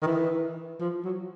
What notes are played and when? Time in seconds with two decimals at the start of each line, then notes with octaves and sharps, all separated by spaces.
0.02 D#3
0.07 E3
0.80 F3
1.04 F#3